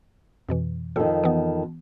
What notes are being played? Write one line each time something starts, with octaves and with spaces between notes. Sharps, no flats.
F2 B2 E3
F2 D#3 A4
E3 B3